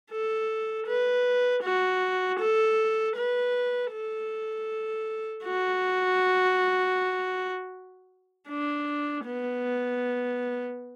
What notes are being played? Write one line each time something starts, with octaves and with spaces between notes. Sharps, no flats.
A4
B4
F#4
A4
B4
A4
F#4
D4
B3